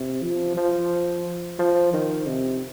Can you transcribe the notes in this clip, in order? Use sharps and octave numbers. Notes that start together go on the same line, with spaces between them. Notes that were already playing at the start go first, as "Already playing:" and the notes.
Already playing: C3
F3
F3
F3
D#3
C3